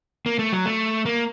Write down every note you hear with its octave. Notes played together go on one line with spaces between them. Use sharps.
A#3
A3
F#3
A3
A#3